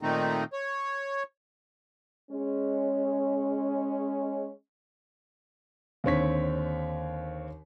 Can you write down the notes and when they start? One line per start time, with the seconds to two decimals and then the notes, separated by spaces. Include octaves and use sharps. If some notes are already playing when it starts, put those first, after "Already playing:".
0.02 A#2 D#3 A3 C4 D#4
0.53 C#5
2.31 G#3 C#4
6.04 D#2 D3 C4 C#5 B6